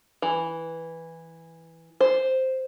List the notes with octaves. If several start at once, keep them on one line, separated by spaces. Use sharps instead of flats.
E3
C5